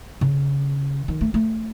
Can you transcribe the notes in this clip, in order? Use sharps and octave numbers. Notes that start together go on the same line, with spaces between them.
C#3
D#3
A3
A3